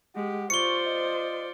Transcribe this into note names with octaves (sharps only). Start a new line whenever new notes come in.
G#3 G4 F#5
F4 C5 D5 C#6 C#7 G7
D#5